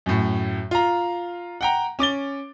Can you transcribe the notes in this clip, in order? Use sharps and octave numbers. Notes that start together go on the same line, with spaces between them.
F#2 A2
F4 A#5
F#5 G5 A#5
C#4 D6 A6 G7